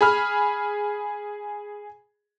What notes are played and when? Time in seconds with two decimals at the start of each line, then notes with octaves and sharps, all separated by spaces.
0.01 G#4 B5 F6